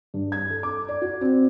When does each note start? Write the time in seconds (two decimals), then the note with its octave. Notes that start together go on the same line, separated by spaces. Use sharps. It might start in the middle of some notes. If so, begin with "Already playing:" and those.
0.14 G2
0.32 G#6
0.50 A4
0.63 D6
0.88 D5
1.02 F#4
1.21 C4